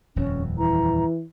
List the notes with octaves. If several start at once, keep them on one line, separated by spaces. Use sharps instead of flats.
D#1 F2 C#4
E3 A#5